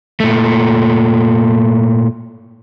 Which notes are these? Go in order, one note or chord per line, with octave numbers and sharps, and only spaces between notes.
A#2 A3